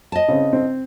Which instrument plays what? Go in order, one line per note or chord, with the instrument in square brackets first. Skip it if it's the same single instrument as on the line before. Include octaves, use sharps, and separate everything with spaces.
[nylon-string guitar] D#5 A5
[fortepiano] C#3 C4
C4